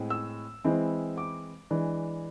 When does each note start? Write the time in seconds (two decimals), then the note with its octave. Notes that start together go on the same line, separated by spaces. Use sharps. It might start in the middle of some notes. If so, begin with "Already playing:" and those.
Already playing: A2 G#3 C4
0.10 E6
0.64 E3 G#3 C4 E4
1.18 D6
1.70 E3 G#3 D4